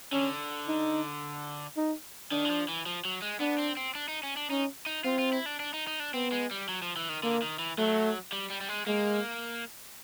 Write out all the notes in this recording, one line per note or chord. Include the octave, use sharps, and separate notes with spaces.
D3 C#4
D#4
D#4
D#3 D4
E3
F3
E3
F3
F#3
G#3
B3 D4
C4
C4
D4
D#4
C#4
D4
C#4 D#4
D#4
C4 F4
F4
E4
D4
D4
D#4
D#4
D4
B3 C4
G#3
G3
F#3
F3
E3
D#3
D3 A#3
D#3
E3
F#3 A3
G3
G3
G3
G#3
G#3 A#3